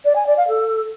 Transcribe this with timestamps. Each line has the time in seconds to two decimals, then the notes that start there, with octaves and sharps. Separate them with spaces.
0.05 D5
0.16 G#5
0.27 D5
0.37 F5
0.48 A4